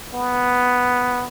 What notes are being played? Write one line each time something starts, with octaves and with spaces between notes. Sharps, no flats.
B3